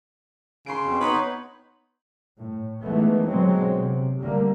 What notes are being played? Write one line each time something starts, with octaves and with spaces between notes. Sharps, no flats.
C#3 C6 D7
F2 B2
B3 D#4 C#5 B5
A2
D#3 E3 G#3 A3 B3
B2 D3 F#3 G#3 B3 C4
C3
D3 G3 A3 A#3